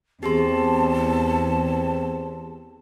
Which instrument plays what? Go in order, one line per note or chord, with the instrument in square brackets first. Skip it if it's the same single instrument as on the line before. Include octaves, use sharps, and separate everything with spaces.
[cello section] E2 [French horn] C4 [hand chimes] G4 G#4 C6 [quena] A5